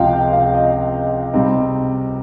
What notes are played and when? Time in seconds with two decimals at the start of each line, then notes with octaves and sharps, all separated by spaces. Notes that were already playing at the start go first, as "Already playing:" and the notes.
Already playing: C#2 C3 F3 D#5 F5 G5
0.13 G5
0.33 F5
0.54 D#5
1.33 C3 G3 C4 D#4